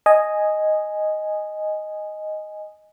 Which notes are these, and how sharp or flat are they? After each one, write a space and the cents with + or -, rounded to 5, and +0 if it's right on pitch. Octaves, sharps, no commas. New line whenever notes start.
D#5 +0 G#5 +0